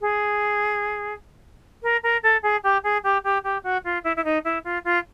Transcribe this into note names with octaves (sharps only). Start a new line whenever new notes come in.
G#4
A#4
A#4
A4
G#4
G4
G#4
G4
G4
G4
F#4
F4
E4
E4
D#4
E4
F4
F4